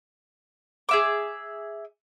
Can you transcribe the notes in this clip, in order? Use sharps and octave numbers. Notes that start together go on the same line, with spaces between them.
G#4 E5 D6